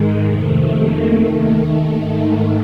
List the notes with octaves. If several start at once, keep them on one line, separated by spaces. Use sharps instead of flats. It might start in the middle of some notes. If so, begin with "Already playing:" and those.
Already playing: G#2 D#3 G#3
F2 C3 D#3 A3
A#3
D#2 D#3 A3
G#2 D#3